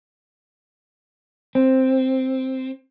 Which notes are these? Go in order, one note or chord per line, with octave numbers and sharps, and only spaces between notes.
C4